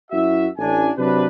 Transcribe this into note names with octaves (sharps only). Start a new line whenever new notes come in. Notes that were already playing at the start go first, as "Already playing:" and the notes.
F#2 E4 F#4 E5
A1 D4 G#5
C3 F#3 D4 B4